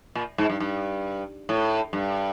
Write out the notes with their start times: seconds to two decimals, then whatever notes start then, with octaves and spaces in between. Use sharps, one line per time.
0.15 A#2
0.38 G#2
0.49 G2
0.60 G2
1.49 A2
1.93 G2